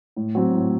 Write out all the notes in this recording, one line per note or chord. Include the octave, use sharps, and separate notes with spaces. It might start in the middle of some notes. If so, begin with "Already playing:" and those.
A2
F#3 C4
A2